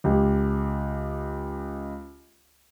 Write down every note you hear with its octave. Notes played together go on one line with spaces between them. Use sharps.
C#2 G4